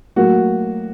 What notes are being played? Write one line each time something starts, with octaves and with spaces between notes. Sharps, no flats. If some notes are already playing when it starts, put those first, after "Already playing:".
A2 F#3 A#3 F#4